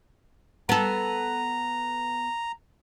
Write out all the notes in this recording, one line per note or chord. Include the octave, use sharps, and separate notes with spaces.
B3 A4 A#5